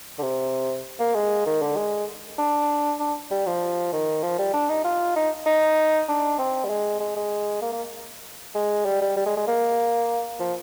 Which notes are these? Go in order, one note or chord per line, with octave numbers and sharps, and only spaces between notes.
D3
C3
A#3
G#3
D#3
D3
G#3
D4
D4
G3
F3
D#3
F3
G3
D4
D#4
F4
D#4
D#4
D4
C4
G3
G#3
G#3
G#3
A#3
A#3
G#3
G3
G3
G3
G#3
G#3
A#3
F3